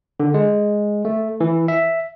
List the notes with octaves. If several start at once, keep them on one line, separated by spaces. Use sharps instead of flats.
D3
G#3
A3
E3
E5